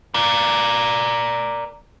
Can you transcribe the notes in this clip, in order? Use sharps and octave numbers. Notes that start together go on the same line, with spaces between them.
A#4 D5